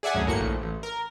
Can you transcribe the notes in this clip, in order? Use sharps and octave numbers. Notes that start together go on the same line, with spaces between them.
G#4 D5 E5 F#5 G#5
G#1 D2 F#3 C#4 G#4
G1 A2 A#3 F#4 C#7
A#1 A2
A1
A#4